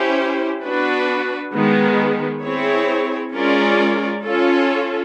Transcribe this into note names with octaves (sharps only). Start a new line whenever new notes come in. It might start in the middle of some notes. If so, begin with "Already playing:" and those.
Already playing: C#4 E4 G4 C5
B3 D4 F#4 B4
D#3 G#3 B3
C4 E4 G#4 C#5
G#3 C#4 F4 A#4 D5
C#4 F4 A4